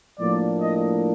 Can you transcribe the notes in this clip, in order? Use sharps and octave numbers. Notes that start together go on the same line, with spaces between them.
A2 F3 A#3 D4 D5
D#5